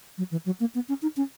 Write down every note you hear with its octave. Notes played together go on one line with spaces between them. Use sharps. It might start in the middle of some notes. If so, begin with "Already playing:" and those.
F#3
E3
F#3
A#3
B3
C#4
D#4
C#4